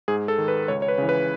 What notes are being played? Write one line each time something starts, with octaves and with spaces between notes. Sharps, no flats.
G#2 G#4
A4
D#3
B4
C#2 C#5
C#5
B4
C#3 E3
B4